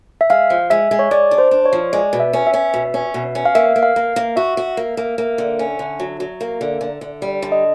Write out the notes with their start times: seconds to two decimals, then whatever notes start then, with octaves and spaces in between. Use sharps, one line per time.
0.21 E5
0.30 G#3 F5
0.50 F3
0.70 G#3 E5
0.91 G#3
0.99 C#5
1.11 G#3 D5
1.31 D4
1.38 C5
1.51 D4
1.66 C#5
1.73 F3
1.93 G#3 D5
2.13 B2
2.20 E5
2.33 C#4
2.47 E5
2.54 C#4
2.74 B2
2.94 C#4
3.14 B2
3.35 C#4
3.45 F5
3.55 A#3 E5
3.76 A#3
3.83 F5
3.96 A#3
4.16 A#3
4.36 F#4 E5
4.57 F#4
4.77 A#3
4.97 A#3
5.18 A#3
5.38 D3
5.59 C#4
5.79 D3
6.00 F#3
6.20 F#3
6.41 A#3
6.61 D3
6.81 D3
7.01 D3
7.22 G3
7.42 D3
7.52 D#5